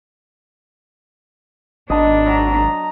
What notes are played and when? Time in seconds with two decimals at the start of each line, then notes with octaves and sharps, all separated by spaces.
1.90 G#1 B3 D4 D#5 A5 A#5
2.26 F#3 A#5